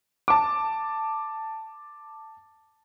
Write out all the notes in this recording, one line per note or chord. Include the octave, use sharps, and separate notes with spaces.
A5 D6